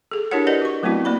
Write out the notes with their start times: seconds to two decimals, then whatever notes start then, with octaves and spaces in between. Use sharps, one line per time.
0.11 G#4 A4
0.31 D4 E4 G4 A#4 C#5 F#5
0.47 G4 A#4 B4 D5 D#5 F#5
0.62 F#4 C#6
0.83 F#3 A3 B3 C4 E4 F#4
1.05 A#3 D5 B5